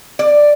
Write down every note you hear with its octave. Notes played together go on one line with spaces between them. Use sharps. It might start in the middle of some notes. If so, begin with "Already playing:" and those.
D5